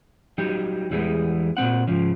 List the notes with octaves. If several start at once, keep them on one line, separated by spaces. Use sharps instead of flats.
F#3 G3 D#4 G4
E2 E3 G3 G#3 B3
A#2 G#3 C4 F#5
G#2 C#3 F3